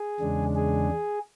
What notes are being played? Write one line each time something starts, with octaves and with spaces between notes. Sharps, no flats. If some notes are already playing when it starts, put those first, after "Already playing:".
Already playing: G#4
E2 C#3 G#3 D4
G#4